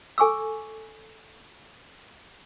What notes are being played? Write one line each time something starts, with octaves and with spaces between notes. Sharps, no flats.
A4 G#5 C#6 D6 E6